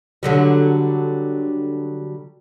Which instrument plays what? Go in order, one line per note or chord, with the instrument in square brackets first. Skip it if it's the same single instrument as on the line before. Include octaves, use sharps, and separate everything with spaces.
[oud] D3 F#3 G3